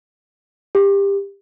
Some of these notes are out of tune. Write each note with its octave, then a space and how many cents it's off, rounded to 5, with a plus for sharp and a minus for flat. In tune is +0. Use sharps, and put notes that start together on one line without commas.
G4 +20